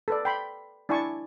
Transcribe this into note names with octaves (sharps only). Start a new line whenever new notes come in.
A4 B4 D5
G5 B5 C6
D4 E4 D5 G#5 A5 C#6